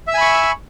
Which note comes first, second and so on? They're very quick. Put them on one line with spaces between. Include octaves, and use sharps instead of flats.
E5 E6 G#5 B5 C#6